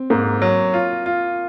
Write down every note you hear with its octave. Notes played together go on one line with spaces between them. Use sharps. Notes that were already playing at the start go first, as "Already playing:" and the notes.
Already playing: C4
G#2 A#3
F#3
F4
F4